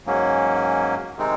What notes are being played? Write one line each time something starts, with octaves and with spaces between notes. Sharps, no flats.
G#2 F#3 A#3 C#4
C3 D#3 G#3 C4 D#4